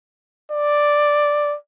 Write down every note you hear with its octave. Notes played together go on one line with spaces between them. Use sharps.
D5